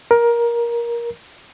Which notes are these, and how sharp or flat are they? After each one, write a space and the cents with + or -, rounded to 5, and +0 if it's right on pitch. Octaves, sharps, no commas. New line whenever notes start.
A#4 +15